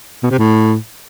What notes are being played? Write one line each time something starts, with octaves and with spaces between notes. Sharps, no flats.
B2
C3
A2